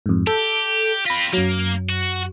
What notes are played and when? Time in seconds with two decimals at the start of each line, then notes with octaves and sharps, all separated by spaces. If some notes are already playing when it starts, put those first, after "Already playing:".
0.06 F2 G#2
0.27 G4 A4
1.06 C4 F4 B5 A#6 B6
1.33 F#2 F#3 A#3
1.89 F#4